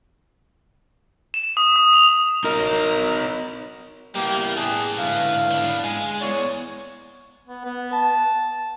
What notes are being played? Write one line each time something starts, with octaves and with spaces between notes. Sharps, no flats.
E7
D#6
D#6
F7
D#4 F#4 A#4 D#5
G3 A#3 B3 E4 G4
G#4 B4 A5
G#2 D3 E4 F5
B3 D4
G#3 G#5
B3 E4 C#5 D5
B3
B3
A5